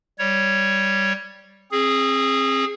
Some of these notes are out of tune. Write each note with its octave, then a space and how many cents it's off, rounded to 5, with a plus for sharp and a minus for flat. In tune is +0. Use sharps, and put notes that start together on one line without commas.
G3 -5 C#5 +0
C4 +35 G#4 -5